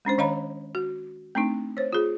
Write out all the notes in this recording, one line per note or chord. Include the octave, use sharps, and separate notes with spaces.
G#3 C#4 D4 C5
D#3 C#5 D#5 F5 A#5 B5
F#4
A3 C4 D4 D#4
C5 C#5
F4 G#4